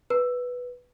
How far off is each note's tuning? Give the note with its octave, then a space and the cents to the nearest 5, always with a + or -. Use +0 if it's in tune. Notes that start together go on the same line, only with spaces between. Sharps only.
B4 -5